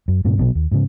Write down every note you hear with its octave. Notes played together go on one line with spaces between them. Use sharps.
F#2
G2 A#2 C#3
A#1 B2 E3 F#3
D#2
G#2 C#3